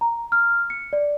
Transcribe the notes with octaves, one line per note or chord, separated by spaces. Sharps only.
A#5
F6
C#7
D5